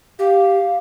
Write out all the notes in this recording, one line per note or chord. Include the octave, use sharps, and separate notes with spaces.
G4 F5